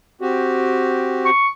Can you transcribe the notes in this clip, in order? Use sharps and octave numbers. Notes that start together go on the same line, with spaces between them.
C4 F#4 G4
C#6